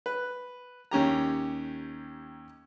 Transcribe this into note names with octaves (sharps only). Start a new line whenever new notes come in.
B4
D#2 C#4 G4 A#5